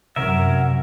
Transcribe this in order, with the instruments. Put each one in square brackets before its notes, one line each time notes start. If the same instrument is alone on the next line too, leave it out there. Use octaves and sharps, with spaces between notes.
[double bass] F#2 [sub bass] C3 [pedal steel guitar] C#4 A#4 E5 [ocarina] F#5